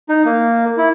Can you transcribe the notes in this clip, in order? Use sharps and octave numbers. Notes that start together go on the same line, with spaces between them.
D#4
A#3
E4